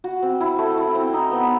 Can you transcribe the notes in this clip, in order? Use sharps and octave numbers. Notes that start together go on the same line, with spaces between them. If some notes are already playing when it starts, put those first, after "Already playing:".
F#4
C4
E4
A3
E4
C4
D#4
B3